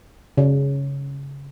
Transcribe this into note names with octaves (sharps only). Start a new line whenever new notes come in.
C#3